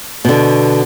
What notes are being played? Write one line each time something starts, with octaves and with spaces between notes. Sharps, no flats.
B2 D3